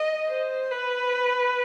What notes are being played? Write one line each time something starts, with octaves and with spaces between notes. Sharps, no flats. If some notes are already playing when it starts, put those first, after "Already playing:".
Already playing: D#5
C5
B4